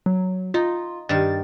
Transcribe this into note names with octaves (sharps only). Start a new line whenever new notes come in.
F#3
D#4 F4
G2 D#3 A6